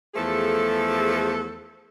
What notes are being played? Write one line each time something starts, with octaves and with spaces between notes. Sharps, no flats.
E2 F3 A3 G#4 A4